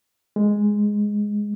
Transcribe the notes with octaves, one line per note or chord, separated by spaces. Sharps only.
G#3